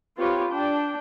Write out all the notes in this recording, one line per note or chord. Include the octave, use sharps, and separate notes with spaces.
C4 F4 G4 B4 C#5
D4 G5